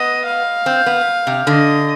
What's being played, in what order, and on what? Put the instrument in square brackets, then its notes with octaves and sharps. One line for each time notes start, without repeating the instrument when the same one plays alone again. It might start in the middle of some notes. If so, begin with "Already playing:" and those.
Already playing: [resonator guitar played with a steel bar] B3 [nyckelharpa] D#5
[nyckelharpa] F5
[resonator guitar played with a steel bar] C4
B3
C3
[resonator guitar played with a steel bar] D3 [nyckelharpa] D#5